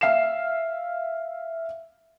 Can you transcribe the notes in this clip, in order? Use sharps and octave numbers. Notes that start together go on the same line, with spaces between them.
E5 F5 C7 E7